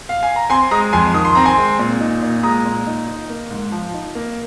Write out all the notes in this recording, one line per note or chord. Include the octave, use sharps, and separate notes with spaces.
F5
G#5
A#5
C4 G#5 C6
G#3 A#5 D#6
F2 G#5 C6
D#3 D#6
C6
C4 A#5
G#5 C6
G#3
A#2
D#4
A#2
G#3 A#5 D#6
A#2
D#4
D#4
A#3
G#2
F3
D#4
A#3